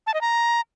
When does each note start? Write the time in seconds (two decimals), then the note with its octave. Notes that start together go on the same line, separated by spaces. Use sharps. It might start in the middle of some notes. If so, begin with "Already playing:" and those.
0.07 A5
0.14 D#5
0.21 A#5